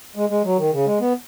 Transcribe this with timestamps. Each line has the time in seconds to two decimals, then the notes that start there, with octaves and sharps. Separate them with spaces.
0.16 G#3
0.30 G#3
0.44 F#3
0.58 D#3
0.73 C#3
0.86 G#3
1.00 B3